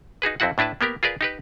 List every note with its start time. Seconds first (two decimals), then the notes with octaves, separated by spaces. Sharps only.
0.22 D#4 F#4 G#4 B4
0.40 F2 C4 E4 F#4 F#5
0.58 A2 D4 E4 B4 A5
0.81 A#3 B3 G4 A#4
1.03 F4 G#4 A#4 B4 D5
1.21 D#4 G4 B4